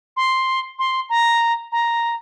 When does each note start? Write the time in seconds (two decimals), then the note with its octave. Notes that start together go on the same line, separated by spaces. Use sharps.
0.17 C6
0.79 C6
1.10 A#5
1.72 A#5